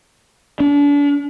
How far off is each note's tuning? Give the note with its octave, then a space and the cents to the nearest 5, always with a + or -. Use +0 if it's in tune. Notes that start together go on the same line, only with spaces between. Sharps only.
D4 -35